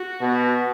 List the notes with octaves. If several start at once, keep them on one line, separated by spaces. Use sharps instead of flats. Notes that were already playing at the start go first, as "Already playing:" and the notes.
Already playing: F#4
B2